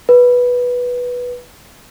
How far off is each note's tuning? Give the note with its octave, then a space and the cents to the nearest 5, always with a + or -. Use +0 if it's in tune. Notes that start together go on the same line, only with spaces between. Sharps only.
B4 -10